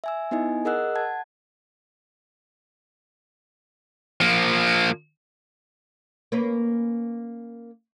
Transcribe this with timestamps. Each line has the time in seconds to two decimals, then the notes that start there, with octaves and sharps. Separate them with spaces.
0.04 E5 G#5 E6
0.31 B3 D#4 E4 D#5 G#5
0.65 G#4 A#4 D#5 F#5 E6 F#6
0.95 F#5 A5 G#6
4.21 F3 A#3
6.32 A#3 C#4 B4